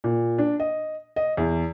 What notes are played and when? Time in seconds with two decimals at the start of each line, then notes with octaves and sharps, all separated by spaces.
0.04 A#2
0.38 D4
0.60 D#5
1.16 D#5
1.37 E2